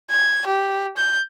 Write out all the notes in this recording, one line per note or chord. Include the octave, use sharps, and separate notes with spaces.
G#6
G4
G6